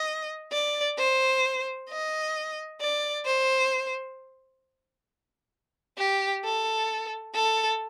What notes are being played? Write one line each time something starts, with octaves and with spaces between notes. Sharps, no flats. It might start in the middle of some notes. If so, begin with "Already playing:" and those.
Already playing: D#5
D5
C5
D#5
D5
C5
G4
A4
A4